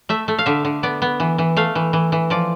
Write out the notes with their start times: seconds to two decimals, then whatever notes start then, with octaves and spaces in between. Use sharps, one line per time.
0.09 A3 E5
0.28 A3
0.39 F5
0.46 D3 E5
0.65 D3
0.83 B3 D5
1.02 B3
1.20 E3
1.38 E3
1.57 A3 F5
1.75 E3
1.93 E3
2.12 E3
2.30 F3 D5